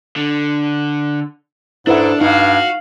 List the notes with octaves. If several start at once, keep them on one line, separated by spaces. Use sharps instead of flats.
D3
G#2 D4 E4 A4 B4 F#5
G2 D#4 F#4 F5